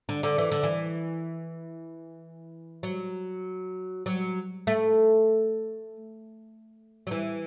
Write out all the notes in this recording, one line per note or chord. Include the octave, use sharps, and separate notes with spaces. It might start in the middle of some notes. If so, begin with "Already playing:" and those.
D3
D3
E3
D3
E3
F#3
F#3
A3
F#3
E3